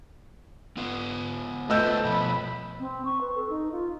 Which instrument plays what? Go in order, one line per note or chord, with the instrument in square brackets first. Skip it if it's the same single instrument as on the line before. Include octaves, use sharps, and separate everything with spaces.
[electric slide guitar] B3 F4
[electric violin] A3 F4 [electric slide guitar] B4 C5 G5 [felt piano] D#5 E6 G6
[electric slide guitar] B2 F3 B3 [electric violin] B5
[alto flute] C4
C#6
B4
A4
D#4
F4